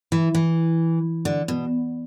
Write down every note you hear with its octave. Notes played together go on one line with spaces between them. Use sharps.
E3
E3
D3
B2